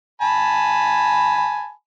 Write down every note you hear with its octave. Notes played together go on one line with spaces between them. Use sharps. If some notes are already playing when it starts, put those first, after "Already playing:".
G#5 A5 B5